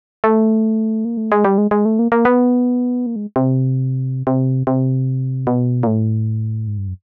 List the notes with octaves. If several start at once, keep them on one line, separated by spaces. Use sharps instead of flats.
A3
A#3
A3
G#3
G3
G#3
G#3
A3
A#3
A#3
B3
A#3
G#3
C3
C3
C3
B2
A#2
A2
G#2
G2
F#2